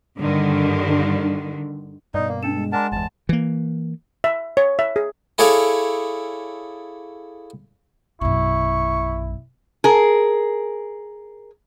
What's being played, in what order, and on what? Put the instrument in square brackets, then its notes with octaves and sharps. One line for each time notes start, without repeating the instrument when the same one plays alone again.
[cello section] G2 D3 D#3
[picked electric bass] G2 B2 [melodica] D#4 [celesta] D5
[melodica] A#3
[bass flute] C#4 [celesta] D4 E7 [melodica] A4
[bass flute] G#3
[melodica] D4 A#4 A5 [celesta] F#5 G#5 C6
[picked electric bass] G1 E2 [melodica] A5
[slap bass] E3 A#3
[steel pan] E5
C#5
E5
G#4
[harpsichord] E4 G#4 A4 C#5 D5 F5
[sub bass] A#1 [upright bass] F#2 B2 [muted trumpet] E4 [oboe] C#6
[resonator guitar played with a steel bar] G#4 A#4